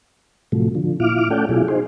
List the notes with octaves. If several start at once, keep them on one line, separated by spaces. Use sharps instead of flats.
A2 C3 F3 F#3 A3
D3 F3
A#2 E4 F4 D6 F6
A3 C#4 A4 D5 F#5 G5
B2 F#3 E4 F4 G#4
D#4 G#4 C5